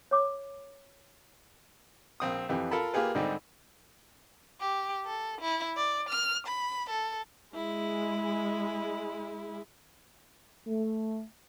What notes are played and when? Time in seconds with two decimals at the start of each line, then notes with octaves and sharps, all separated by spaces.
0.11 C#5 D6
2.20 A#1 C4 D#6
2.49 F2 E3 G4
2.71 F4 A4 A#4 A5 B5
2.94 A#3 F4 G4 G#4 B4
3.15 G#2 D3 G3 C4 D#4 G4
4.61 G4
5.06 A4
5.41 E4
5.77 D5
6.09 F6
6.47 B5
6.90 A4
7.54 G#3 E4
10.67 A3